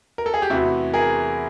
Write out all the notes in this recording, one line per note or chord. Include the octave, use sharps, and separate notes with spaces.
A#4
A4
G#4
G4
E2 C3 E3 A3 E4 F#4
G#4 A#4